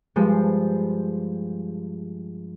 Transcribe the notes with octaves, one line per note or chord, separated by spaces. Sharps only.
G2 F3 G#3